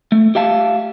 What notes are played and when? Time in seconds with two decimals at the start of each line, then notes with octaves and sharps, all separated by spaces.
0.12 A3
0.35 G4 E5 F5 A5